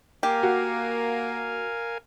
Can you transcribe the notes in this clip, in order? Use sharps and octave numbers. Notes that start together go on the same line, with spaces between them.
A#3 G4 A#4 F5 G#5
F#4